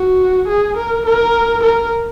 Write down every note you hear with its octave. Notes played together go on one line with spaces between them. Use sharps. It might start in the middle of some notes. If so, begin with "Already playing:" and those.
Already playing: F#4
G#4
A#4
A#4
A#4